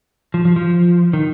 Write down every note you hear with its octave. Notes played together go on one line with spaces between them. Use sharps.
F3
F3
F3
D#3